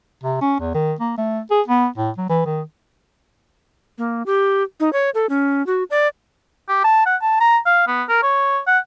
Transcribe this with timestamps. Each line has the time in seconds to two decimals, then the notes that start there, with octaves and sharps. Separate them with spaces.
0.24 C3
0.41 C#4
0.60 E2
0.74 D#3
1.00 A#3
1.18 A3
1.51 G#4
1.68 B3
1.97 A2
2.18 F#3
2.29 E3
2.46 D#3
3.98 A#3
4.26 G4
4.80 D#4
4.93 C#5
5.15 A4
5.29 C#4
5.67 F#4
5.90 D5
6.69 G4
6.84 A5
7.06 F#5
7.21 A5
7.41 A#5
7.66 F5
7.87 B3
8.09 A#4
8.23 C#5
8.67 F#5